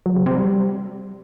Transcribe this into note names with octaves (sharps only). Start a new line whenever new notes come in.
F#3
C#3
C3
G3